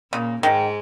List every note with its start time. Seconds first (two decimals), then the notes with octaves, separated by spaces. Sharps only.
0.12 A#2 C#3 A#3
0.43 G#2 D#3 G#3